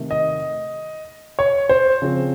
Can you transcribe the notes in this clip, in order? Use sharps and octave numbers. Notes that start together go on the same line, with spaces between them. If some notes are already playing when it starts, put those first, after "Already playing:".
Already playing: C3 D#3 A3
D#5
C#5
C5
C#3 F3 C4